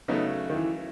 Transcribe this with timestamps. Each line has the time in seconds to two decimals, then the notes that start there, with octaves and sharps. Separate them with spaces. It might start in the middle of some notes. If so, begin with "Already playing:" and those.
0.08 C#3 F#3 A3 B3 D#4
0.50 D#3
0.55 E3